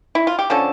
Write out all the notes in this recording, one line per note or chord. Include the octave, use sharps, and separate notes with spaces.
E4
F4
G4
D3 F3 C#4 A4